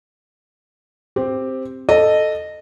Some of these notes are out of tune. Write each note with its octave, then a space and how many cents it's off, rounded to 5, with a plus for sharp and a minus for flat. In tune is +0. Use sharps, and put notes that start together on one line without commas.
C4 +0 G4 +0
A4 +0 D#5 -15